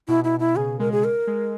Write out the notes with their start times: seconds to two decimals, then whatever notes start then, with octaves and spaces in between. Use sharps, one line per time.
0.08 B2 E4
0.24 E4
0.40 E4
0.56 C#3 G#4
0.80 G#3 A#4
0.92 G#4
1.04 A#4
1.27 G#3